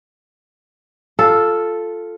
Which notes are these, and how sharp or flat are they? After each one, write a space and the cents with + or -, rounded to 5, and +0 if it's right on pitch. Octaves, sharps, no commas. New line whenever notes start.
F4 +0 A4 +0